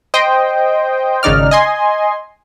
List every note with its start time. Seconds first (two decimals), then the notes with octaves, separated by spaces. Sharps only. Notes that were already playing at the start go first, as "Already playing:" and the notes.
0.14 C5 D#5 G5
1.23 G#1 C#3 D#4 D5 F6
1.51 D#5 G#5 C6